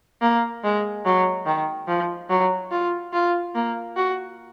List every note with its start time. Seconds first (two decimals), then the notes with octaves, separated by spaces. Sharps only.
0.22 A#3
0.64 G#3
1.05 F#3
1.46 D#3
1.88 F3
2.30 F#3
2.71 F4
3.13 F4
3.55 A#3
3.96 F#4